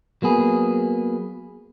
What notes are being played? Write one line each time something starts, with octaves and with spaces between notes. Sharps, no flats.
F#3 A#3 B3 G#4